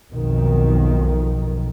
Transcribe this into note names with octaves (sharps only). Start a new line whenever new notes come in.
B1 F2 D#3